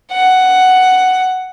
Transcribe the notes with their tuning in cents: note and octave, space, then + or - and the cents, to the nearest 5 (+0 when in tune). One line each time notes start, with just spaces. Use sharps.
F#5 +5